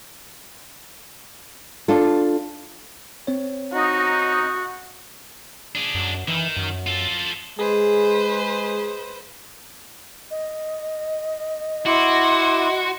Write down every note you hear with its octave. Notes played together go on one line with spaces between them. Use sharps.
D4 F4 A4
C4 C#5
D#4 F#4
D4 G#4
F#2
D#3 E3
F#2
F4 A4
G#3 G#4 B4 C5
D#5
E4 F#4 C6 D6